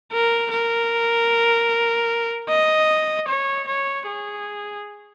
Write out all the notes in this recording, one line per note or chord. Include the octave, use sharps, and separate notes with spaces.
A#4
A#4
D#5
C#5
C#5
G#4